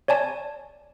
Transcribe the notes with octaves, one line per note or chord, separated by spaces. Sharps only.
C#5 D5 G#5 A5